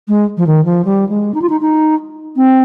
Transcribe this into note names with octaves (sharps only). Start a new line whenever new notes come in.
G#3
F3
D#3
F3
G3
G#3
D#4
F4
D#4
D#4
C4